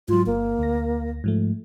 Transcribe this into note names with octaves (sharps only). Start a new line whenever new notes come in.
G#2 F#3 F4
G1 A#3
D2 A#6
G#2 F3 A3